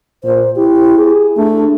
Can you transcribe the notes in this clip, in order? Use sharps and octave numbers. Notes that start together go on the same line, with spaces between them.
A#2 C5
E4 G4
G#4
A3 D4